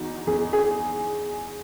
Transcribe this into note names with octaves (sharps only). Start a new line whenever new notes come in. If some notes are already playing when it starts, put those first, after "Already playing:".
Already playing: E2 D#4 F#4
E2 G#4
G#4